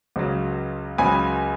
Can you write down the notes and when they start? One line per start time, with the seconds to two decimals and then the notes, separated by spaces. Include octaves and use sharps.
0.16 C#2 C#3 F#3
0.98 C#2 C#3 F#3 G#5 B5